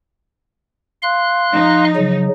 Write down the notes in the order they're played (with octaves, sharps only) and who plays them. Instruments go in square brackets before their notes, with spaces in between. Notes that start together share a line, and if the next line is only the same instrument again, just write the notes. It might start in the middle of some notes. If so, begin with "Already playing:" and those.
[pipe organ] F5 C6 F#6
[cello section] F3 D#4
[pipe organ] C#3 F#3